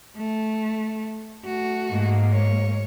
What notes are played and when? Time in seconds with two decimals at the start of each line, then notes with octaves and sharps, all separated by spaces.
0.17 A3
1.44 A3 F#4
1.90 G#2 A#3
2.34 C#5